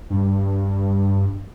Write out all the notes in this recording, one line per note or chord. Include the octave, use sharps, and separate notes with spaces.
G2